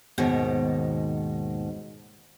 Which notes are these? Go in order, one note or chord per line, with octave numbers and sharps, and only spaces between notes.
D#2 G#2 B2 D#3